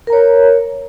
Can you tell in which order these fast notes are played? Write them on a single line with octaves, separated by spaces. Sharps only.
A#4 A#5 C#5